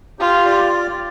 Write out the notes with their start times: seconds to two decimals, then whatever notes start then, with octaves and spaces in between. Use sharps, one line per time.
0.19 F4 G4
0.46 D5